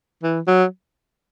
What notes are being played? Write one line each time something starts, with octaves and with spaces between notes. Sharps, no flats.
E3
F#3